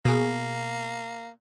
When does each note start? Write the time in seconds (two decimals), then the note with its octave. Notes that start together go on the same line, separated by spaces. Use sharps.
0.05 B2 A#3 G#4